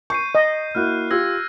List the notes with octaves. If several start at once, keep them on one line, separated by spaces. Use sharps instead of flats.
C#6 G6 C7 D#7
D#5
A#3 E4 F#4 F6 F#6
F4 G4 E6 G#6 A#6